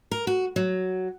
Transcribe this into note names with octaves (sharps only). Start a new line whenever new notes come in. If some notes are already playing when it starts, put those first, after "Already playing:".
A#4
F#4
F#3